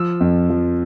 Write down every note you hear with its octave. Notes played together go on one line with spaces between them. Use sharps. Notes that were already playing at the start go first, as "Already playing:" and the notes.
Already playing: F3 E6
F2
F3